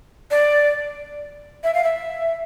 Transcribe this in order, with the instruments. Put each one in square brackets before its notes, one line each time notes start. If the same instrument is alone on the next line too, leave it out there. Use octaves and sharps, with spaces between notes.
[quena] D5
E5
F5
E5